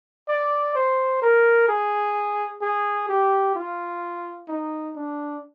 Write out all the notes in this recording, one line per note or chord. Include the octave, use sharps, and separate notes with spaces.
D5
C5
A#4
G#4
G#4
G4
F4
D#4
D4